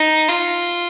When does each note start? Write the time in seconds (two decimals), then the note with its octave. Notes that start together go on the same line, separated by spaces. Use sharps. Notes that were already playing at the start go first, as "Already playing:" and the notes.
Already playing: D#4
0.28 F4